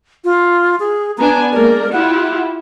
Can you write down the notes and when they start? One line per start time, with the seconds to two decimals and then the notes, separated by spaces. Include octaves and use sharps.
0.25 F4
0.80 G#4
1.18 B3 D4 G#5 A#5
1.53 G#3 A#3 A#4 D5
1.93 E4 F4 G4 F#5